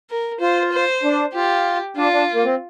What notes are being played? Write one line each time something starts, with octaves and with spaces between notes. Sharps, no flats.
A#4
F4 C5
C5
D4
F4 G4
D4 F4
D4
A#3
C4